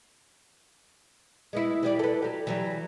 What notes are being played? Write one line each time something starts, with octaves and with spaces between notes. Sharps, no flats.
G#3 B3 E4
E3 G3 D5
A4 B4
F#3 G4
E3 F#3 G3